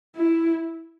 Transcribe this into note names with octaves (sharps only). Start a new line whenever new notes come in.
E4